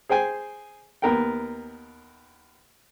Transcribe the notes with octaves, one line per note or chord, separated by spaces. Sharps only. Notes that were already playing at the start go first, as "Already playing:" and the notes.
G#4 C5 G5 G#5
D#2 B3 A#4 G5